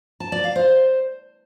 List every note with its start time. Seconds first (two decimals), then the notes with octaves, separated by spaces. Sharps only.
0.20 A5
0.32 D5
0.44 F5
0.56 C5